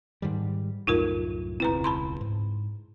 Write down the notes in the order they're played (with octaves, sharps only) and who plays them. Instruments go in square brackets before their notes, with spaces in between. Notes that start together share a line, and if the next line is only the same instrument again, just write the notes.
[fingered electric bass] G#2 D#3 G3
[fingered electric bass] C2 F#2 A2 [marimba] D#4 F4 A#4
[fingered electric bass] E1 C#2 C4 [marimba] E4 B4 A#5
[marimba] A5 B5 C6
[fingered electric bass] G#2